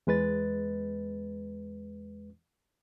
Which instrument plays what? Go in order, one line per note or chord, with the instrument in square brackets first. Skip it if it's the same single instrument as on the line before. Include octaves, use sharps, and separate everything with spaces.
[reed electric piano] E2 G#3 B4 A6